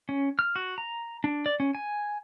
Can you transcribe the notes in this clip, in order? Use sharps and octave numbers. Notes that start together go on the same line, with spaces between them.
C#4
F6
F#4
A#5
D4
D5
C#4
G#5